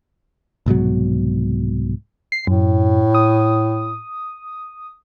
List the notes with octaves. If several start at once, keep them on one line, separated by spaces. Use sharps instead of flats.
C2 G#2 B2 F#3
C7
F#2 A2
D#6